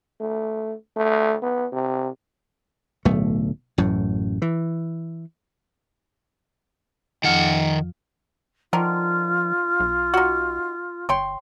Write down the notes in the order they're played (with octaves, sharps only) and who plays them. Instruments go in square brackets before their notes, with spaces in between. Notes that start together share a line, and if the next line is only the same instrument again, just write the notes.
[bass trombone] A3
A3
B3
C3
[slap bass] D1 B1 A3
A1 F#2 A2
E3
[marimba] F2 F3 F6 [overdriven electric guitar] D#3 F#5
[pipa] D3 D#3 A#4 [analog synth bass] F3 [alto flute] F4
[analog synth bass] B1
[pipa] D#4 F#4
[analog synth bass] G1 [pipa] C#5 G5 C6